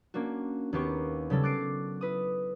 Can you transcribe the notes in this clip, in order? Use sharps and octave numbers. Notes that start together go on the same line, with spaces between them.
A#3 C#4 D4 F#4
D#2 A#3 B3 G4 C#6
C#3 F#3 G3 A4
D6 F#6 A6 C7 D7
E4 B4 D#6